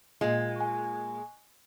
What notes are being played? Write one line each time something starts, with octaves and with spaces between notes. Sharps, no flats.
A#2 G#3 F4
G#5 C#6